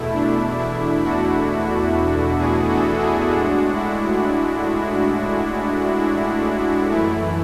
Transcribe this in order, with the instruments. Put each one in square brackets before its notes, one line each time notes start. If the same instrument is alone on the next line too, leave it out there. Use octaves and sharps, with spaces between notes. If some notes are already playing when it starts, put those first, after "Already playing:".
Already playing: [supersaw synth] E2 B2 A3 E4
D4
E4
D4 F#4
E4 G#4
F#4 A4
E4 G#4
A2 G#3 D4 F#4
E4
E4
D4
E4
F#2 E3 A3 E4